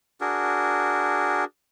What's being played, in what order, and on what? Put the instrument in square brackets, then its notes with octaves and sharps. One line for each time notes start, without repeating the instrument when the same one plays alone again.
[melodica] D4 F#4 G#4 A#4